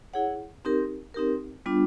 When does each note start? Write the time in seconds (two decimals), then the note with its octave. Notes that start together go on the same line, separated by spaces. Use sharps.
0.13 E4 G#4 C#5 F#5
0.65 C4 D#4 G4 A#4
1.14 C4 D#4 G4 A#4
1.66 G3 B3 D4 F4